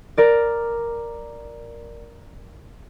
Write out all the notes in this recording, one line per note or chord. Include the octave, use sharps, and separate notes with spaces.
A#4 D5